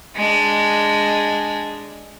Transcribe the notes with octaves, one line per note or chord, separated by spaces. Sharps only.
G#3 D4